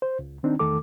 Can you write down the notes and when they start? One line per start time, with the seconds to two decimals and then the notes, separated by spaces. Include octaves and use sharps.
0.02 C5
0.19 C#2
0.43 D#3 C4 D4 D#4
0.59 E2 D#3 A3 A4 D6